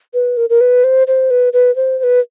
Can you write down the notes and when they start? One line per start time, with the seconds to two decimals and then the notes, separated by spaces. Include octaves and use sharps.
0.14 B4
0.37 A#4
0.50 A#4
0.61 B4
0.84 C5
1.07 C5
1.31 B4
1.53 B4
1.76 C5
1.99 C5
2.03 B4